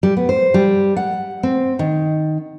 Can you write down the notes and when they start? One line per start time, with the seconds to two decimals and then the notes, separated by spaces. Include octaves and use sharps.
0.03 G3
0.17 B3
0.29 C5
0.54 G3
0.96 F#5
1.43 C4
1.79 D#3